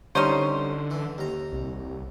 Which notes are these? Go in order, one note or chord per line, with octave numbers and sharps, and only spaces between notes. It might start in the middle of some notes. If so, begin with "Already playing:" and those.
D3 G3 C#4 D#4 C5
E3
D#2 A#5
C2